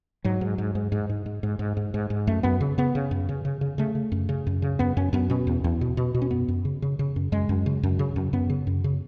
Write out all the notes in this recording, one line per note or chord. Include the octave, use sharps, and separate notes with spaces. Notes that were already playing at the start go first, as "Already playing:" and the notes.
G#2 F#3
G#2
G#2
G#2
G#2
G#2
G#2
G#2
G#2
G#2
G#2
G#2
F#2 A3
F#2 B3
C#3
C#3 B3
C#3
F#2
C#3
C#3
C#3
C#3 A3
C#3
F#2
C#3
F#2
C#3
F#2 B3
F#2 C#4
F#2 B3
B2 C#4
E2
E2
B2
B2
B2
C#4
F#2 B3
F#2
C#3
C#3
C#3
F#2
F#2 G#3
F#2
C#3
F#2
C#3
F#2
F#2 B3
C#3
F#2
C#3